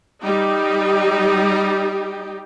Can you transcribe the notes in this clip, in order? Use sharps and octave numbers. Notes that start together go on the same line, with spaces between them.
G3 D#4 G4